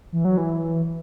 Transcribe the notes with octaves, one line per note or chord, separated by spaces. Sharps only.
E3
F#3
E3